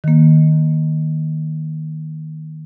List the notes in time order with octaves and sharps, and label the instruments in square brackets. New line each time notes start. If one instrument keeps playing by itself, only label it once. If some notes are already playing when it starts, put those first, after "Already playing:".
[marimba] D#3 A#3